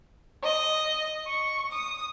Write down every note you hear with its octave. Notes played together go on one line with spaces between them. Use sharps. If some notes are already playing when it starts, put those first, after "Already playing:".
D#5
C#6
D#6